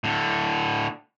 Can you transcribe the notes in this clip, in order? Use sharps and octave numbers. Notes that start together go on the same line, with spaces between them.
A2 D3